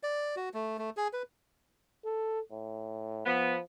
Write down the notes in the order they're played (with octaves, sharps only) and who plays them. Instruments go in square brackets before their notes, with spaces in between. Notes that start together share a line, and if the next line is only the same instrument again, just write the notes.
[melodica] D5
F#4
A3
A3
G#4
B4
[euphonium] A4
A2
[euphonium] F3 [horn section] B3